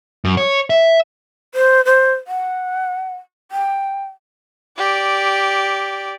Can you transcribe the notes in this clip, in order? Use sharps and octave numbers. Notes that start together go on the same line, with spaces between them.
F#2
C#5
E5
C5
C5
F#5
G5
G4 D5